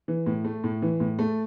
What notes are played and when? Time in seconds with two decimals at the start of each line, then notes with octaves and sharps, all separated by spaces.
0.08 E3
0.26 A2
0.45 A3
0.64 A2
0.82 E3
1.00 A2
1.19 A3